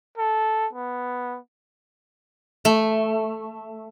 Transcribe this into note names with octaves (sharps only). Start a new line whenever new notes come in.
A4
B3
A3